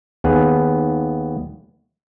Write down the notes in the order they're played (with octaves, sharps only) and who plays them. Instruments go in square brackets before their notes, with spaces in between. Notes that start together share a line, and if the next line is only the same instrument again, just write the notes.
[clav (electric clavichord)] D#2 B3 G#4